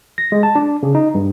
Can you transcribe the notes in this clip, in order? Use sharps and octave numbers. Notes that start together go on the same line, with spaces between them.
A#6
G#3
A5
D4
C#3
D#4
G2